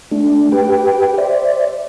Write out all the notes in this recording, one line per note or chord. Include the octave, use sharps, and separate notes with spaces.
A3 D4
G4 B4 G5
C5 D5 E5